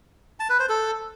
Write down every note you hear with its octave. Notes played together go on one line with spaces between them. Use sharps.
A5
B4
C5
A4